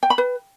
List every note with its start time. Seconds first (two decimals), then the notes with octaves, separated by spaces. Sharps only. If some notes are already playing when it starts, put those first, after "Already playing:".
0.03 G5
0.10 B5
0.18 B4